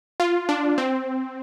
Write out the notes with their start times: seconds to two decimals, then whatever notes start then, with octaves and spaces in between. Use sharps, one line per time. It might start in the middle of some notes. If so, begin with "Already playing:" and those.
0.20 F4
0.49 D4
0.78 C4